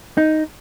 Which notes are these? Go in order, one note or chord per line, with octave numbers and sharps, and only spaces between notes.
D#4